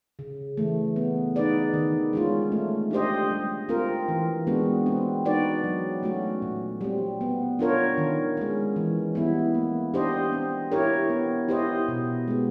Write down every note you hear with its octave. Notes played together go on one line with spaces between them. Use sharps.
C#3
E3 A3
B3
D#4 G#4 B4 D5
D#3
G#3 C#4 F4
A3
D4 G4 C5 D#5
G3
C4 F4 A#4
E3
G#3 B3 D4 F#4
C4
D#4 F#4 B4 D5
F#3
A3 C#4 F#4
A#2
G3 C4
B3
D4 F4 A#4 C#5
D#3
G#3 C#4
E3
G3 B3 E4
A#3
D4 G4 C5 D#5
C4
E4 G4 A#4 C#5
B3
E4 G4 C5 D#5
B2
G#3 B3